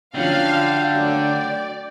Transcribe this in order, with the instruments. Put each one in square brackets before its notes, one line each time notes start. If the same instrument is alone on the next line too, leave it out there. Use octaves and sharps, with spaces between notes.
[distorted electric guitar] D3 [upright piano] F3 F#3 C#4 [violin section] F5 [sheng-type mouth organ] G5
[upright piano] F#3 A3 [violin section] D5